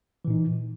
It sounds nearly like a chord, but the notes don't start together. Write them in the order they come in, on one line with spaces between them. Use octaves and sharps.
E3 A#2 D#4